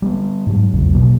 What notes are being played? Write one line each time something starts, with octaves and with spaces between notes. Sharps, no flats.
G3 A#3 B3
G#2 F#3
A#1 E2 C#3 F#3
B2 F#3 A#3